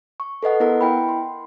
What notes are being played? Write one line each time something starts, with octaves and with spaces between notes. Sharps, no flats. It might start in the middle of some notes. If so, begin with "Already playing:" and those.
C#6
A4 B4 D#5 F#5
B3 E4 A#4 F#5
E4 G5 B5
C6